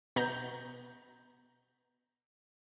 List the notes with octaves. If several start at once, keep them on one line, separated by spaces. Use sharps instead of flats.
B2 A#5 G6